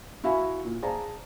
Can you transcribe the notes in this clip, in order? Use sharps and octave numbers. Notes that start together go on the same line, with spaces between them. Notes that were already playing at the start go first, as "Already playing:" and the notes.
E4 F#4 E5 F5 G#5 B5
A#2
G#4 C5 D5 F5 A5 A#5